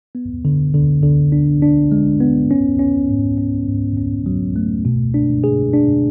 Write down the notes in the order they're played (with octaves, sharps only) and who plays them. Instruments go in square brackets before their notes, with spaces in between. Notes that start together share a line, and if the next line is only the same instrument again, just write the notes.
[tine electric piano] B3
D3
D3
D3
D4
D4
G#3
B3
C#4
C#4
G#2
C#4
G#2
C#4
F#3
A3
B2
D4
G#4
D4